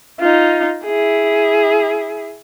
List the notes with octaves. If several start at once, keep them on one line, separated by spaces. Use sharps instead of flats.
D#4 F4
E4 G#4